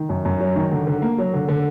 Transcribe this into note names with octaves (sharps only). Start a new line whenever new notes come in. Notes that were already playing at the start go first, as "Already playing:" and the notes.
Already playing: D#3
F#2
F#2
F#3
D#3
D3
D3
A#3
F#3
D3
D3